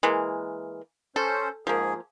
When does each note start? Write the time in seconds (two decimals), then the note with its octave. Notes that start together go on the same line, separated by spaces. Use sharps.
0.03 E3 G#3 A#3
1.16 C#4 A4 C5
1.67 G#2 F3 A#3 G#4